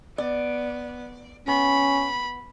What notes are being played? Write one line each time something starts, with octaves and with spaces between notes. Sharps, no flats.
B3 D5
B3 C#4 B5